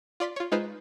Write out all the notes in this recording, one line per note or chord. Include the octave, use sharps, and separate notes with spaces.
F4 D5 C6 B6
F4 C#5
G#3 D#4 F4 B4 C5